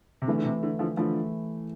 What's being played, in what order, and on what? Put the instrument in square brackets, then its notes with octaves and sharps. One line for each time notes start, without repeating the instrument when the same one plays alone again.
[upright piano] C3
[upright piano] D3 [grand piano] E3 A3 E4
[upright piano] D3
C3
D3
D3 F3
[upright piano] D3 F3 [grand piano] E3 A3 E4